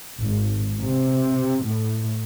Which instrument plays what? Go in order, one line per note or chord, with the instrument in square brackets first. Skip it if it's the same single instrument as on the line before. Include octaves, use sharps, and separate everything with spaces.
[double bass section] G#1
C3
A2